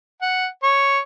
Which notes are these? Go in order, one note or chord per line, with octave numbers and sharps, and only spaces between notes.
F#5
C#5